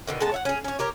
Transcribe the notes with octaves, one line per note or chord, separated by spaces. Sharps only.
B2 D3 D#3
G#3 B3 D#4 A5
C#5 E5 F#5
C#4 G#4
C#4 C#5
G4 A#4 C#5